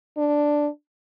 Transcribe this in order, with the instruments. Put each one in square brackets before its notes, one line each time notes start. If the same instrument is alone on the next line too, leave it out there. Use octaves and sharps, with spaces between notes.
[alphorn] D4